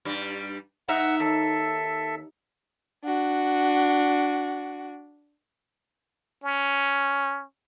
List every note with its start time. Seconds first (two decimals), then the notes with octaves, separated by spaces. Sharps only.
0.05 G2 G3
0.88 G#2 D#4 E5 F#5
1.20 D#2 A4 E5
3.04 D4 F#4
6.43 C#4